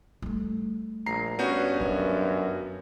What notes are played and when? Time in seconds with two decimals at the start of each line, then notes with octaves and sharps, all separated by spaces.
0.22 G3 A3
1.06 A#1 A#5 C7
1.39 G2 B3 C#4 F#4 G6
1.80 F#2 D#3 D4